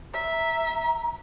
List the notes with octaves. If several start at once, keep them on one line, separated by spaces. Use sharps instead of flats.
E5 A#5